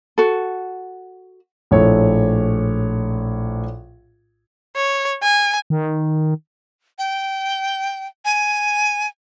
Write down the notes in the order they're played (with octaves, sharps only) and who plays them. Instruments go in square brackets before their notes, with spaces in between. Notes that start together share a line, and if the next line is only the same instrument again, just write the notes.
[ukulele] F#4 A4
[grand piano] A#1 A2 A4 C#5
[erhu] C#5
G#5
[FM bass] D#3
[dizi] G5
G#5